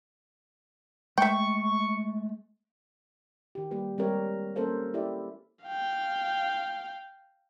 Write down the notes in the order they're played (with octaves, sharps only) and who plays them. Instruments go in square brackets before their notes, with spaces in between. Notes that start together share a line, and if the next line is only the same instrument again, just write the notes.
[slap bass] G#3 A3 [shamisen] E5 G5 [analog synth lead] C#6
[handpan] D#3 G4
G3 A#3 G4 B4
G3 G#3 C4 G4 A#4 C#5
A#3 C#4 A4 A#4 C5 F5
E4 G4 A4 D5 E5
[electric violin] F5 G5